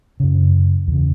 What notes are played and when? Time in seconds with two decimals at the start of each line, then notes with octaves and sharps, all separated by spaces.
0.20 F#2 C#3
0.87 E2 C#3